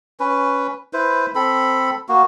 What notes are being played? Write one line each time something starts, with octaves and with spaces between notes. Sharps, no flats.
C#4 B4
E4 B4 C5
C4 A4 B5
A#3 F#4